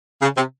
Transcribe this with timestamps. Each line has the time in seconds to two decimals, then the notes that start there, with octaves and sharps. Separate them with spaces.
0.22 C#3
0.37 C3